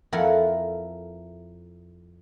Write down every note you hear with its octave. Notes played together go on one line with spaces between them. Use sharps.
F2 F3 E4 A4 A#4 F#5